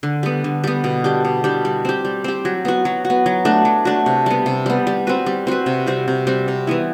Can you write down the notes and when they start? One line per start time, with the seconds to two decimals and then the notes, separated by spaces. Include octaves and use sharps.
0.03 D3
0.23 G3 B3
0.44 D3
0.64 G3 B3
0.84 B2
1.04 G3 D4 G4
1.25 B2
1.44 G3 D4 G4
1.65 G3
1.85 C4 G4
2.05 G3
2.24 C4 G4
2.45 F#3
2.65 B3 F#4
2.85 F#3
3.05 F#4
3.10 B3
3.26 F#3
3.45 A3 D4 F#4
3.65 F#3
3.85 A3 D4 F#4
4.06 C3
4.26 G3 B3
4.46 C3
4.66 G3 B3
4.87 G3
5.07 C4 F#4 B4
5.26 G3
5.47 C4 F#4 B4
5.66 C3
5.86 G3 C4 F#4
6.08 C3
6.27 G3 C4 F#4
6.48 C3
6.67 E3 B3 E4